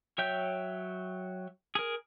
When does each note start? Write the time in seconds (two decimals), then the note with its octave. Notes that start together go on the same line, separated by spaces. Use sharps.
0.18 F#3 C#5 E5 G5 G6
1.75 G#4 A#4